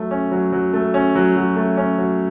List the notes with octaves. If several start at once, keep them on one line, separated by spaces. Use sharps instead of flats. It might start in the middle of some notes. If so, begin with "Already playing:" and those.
Already playing: F#3 A3
C#4
F#3
F#3
A3
C#4
F#3
F#3
A3
C#4
F#3